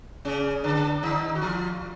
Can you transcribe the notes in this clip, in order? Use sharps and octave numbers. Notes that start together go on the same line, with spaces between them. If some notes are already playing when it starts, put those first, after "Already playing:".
C#3 C#4
D3 D4
D#3 D#4
F#4
F3 F4